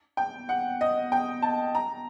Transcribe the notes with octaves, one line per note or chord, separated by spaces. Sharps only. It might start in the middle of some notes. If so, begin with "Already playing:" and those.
G5
F#5
D#5
G5
A5
A#5